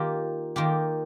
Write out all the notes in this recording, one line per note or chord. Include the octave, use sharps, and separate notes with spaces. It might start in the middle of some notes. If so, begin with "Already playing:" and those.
Already playing: D#3 A#3 F4 G4
D#3 A#3 F4 G4